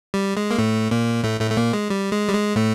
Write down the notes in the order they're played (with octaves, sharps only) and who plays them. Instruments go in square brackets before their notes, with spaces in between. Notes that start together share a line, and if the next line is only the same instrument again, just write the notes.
[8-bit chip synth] G3
G#3
A#3
A2 A3
A#2 A#3
A2 A3
A2 A3
A3
A#2 A#3
G#3
G3
G#3
G3
G#3
A2 A3